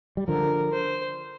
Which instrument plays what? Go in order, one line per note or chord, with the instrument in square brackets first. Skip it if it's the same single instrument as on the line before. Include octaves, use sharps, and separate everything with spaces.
[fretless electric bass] G3
[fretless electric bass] D3 F3 [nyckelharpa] A#4
[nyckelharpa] C5